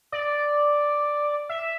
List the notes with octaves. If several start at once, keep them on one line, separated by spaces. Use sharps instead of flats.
D5
E5